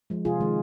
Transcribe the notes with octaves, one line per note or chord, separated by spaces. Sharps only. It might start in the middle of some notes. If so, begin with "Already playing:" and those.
F3 G#3
C3 F4 G#4
D#3 G#3